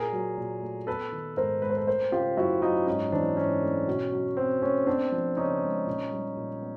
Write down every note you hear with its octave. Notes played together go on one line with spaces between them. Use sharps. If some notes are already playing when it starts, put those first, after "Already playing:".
Already playing: A#2 G#4 A#4
F#3
A#2
A3
B3 A4 B4
D#3
G#2 A#4 C5
G#3 B4
C5
A4 B4
A3 A#4 C5
C#3 F4 G4
F#2 E4 F#4
F#3 D#4 F4
G#2 C#4 D#4
E3 C4 D4
G#2 C#4
A3
B2
F#3
B2 C4
A3 C#4
B3 C4 D4
F3
C#3 C#4 D#4
G#3
A#2
G3
A#2
B3